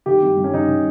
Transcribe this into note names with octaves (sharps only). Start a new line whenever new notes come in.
D#3 G4
G2
G2
C#4
D#3 D#4
D#3